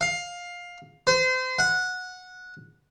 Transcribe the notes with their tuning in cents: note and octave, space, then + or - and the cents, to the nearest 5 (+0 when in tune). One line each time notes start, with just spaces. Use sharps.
F5 +15
C5 -30
F#5 -15